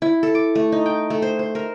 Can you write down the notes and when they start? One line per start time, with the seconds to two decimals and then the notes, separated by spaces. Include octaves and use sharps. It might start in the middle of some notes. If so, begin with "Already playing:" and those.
0.02 E4
0.23 A4
0.35 D6
0.55 A3
0.72 D#4
0.86 G5
1.10 A3
1.22 C5
1.39 C5
1.55 A#4